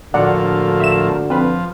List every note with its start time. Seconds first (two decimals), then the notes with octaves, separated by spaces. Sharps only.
0.14 D2 A2 D3 F3 A#3 D5 F#5
0.80 E5 E7
1.30 F3 C4 B4